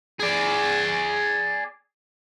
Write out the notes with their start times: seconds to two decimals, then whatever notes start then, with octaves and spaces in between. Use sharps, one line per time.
0.20 G#4 D5